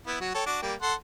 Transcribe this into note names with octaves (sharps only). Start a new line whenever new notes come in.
B3 E4
F#3 F#4
A4 C#5 G5
D4 F#4 D6
G3 A#3 G5
A4 F#5 C6